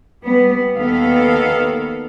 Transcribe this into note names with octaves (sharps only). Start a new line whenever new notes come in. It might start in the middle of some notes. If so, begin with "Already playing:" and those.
G3 B3
D#2 D#3 B3 A4 F5